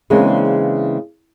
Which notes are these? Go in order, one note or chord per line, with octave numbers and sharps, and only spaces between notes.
C#3 E3 G#3 A#3 C4 D4